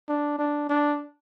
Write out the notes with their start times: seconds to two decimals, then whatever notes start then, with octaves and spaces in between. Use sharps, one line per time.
0.09 D4
0.39 D4
0.69 D4